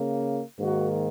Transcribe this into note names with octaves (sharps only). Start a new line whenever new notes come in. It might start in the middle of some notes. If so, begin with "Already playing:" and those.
Already playing: C#3 A#3
G#2 D#3 A#3 F#4